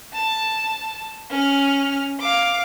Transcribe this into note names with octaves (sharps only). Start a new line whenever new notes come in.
A5
C#4 F6
F5 D6